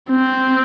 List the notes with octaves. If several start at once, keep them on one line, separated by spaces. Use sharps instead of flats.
C4